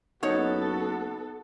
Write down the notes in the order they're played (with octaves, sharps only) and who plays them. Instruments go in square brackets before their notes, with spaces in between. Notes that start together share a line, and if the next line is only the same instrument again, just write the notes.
[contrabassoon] F#1 [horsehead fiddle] B3 A4 [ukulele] D#4 C#5 [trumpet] F#4